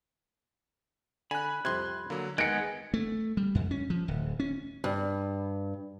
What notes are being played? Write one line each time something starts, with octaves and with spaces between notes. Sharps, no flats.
D3 G#5 B5 F#6
C2 F2 C3 C6 F#6 G#6
D3 F#3 A#3
D#3 G#3 B3 F#6 G#6 A#6 C#7 D7
A3
G3
F2
C#4
F3
D1
C#4
G2